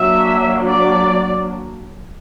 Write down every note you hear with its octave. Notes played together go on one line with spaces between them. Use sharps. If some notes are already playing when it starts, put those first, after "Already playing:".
Already playing: F#3 A#3 D4 E5
D5